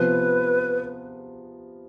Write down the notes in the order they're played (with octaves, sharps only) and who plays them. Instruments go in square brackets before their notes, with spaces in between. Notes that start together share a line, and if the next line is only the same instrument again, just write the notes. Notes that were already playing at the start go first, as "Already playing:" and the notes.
Already playing: [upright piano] C3 F3 B3 [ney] B4